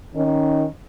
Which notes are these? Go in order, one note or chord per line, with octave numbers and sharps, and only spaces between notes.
D#3 C#4 D#4